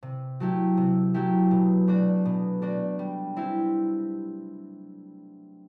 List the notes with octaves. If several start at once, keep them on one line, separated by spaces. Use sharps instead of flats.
C3
F#3 A3 E4 G4
C3
F#3 A3 E4 G4
B2
A3 D4 F#4
B2
A3 D4 F#4
G3
C4 E4 G4